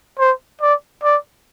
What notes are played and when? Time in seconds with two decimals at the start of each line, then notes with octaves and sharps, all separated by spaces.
0.19 C5
0.61 D5
1.03 D5